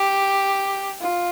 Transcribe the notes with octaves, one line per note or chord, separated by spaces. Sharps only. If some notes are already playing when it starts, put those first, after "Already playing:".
Already playing: G4
F4